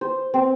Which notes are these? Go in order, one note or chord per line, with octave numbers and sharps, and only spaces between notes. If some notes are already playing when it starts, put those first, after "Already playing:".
C5
C4